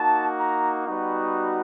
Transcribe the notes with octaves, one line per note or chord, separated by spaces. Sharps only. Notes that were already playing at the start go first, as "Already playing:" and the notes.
Already playing: A#3 D#4 F#4 A5
A#5
G3 B3 D#4 F#4